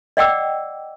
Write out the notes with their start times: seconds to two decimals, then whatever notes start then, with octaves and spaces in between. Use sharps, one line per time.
0.17 D5 D#5 F#5 G5 D6 E6